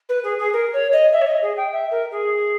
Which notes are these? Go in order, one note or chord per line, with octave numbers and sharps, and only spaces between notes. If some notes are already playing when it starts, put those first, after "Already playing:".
B4
G#4
G#4
A#4
C#5
D#5
E5
C#5
D#5
G#4
G5
E5
A#4
G#4